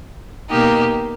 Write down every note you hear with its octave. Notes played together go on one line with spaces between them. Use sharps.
B2 A#3 D#4 G4